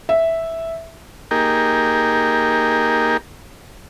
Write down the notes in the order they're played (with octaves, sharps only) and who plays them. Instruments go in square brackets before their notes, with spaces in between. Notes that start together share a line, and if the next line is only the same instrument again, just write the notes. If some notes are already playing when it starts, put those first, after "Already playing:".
[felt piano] E5
[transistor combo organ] A#3 D#4 G4 G#4 A#4